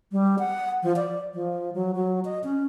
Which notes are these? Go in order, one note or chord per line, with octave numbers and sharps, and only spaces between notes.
G3
F#5
F3
D5
F3
F#3
F#3
D#5
C#4